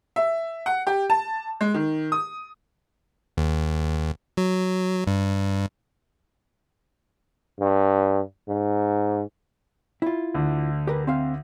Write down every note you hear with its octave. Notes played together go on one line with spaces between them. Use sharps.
E5
F#5
G4
A5
G#3
D#3
D#6
D#2
F#3
G2
G2
G#2
E4 F4
D2 D3
G4 A#4 B4
C4 E5 F5